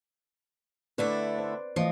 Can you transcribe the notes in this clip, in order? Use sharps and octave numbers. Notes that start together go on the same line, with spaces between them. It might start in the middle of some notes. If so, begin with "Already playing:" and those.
D3 A3 E4 B4 D5
C5
E3 F3 A3 D#5